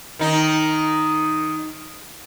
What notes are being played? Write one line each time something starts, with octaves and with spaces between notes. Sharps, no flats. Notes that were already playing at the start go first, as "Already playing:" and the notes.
D#3 D#4